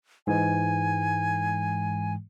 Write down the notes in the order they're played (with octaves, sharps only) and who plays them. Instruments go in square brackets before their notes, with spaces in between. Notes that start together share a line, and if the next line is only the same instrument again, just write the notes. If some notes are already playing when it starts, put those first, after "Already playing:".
[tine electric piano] G#2 E3 G#3 [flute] G#5